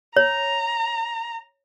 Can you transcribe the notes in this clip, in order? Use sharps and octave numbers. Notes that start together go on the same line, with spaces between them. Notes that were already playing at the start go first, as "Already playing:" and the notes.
C#5 A#5